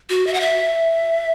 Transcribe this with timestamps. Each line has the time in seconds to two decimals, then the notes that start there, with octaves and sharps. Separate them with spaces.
0.10 F#4
0.27 E5
0.34 F#5
0.40 E5